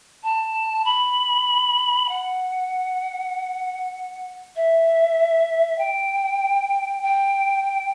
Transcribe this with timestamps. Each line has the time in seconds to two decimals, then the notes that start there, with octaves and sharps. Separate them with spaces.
0.23 A5
0.85 B5
2.09 F#5
4.56 E5
5.78 G5
7.03 G5